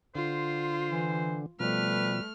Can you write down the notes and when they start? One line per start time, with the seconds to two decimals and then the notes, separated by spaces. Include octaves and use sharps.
0.15 D3 F4 C5
0.91 E3
1.60 B2 F3 G3 A3 B4 F6